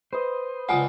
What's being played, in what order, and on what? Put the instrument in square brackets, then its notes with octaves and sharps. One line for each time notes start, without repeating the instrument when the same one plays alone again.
[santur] B4 D#5 [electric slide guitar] C5
[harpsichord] C#2 F#3 F4 [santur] D5 A5 [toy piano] F#5 G#5 D#6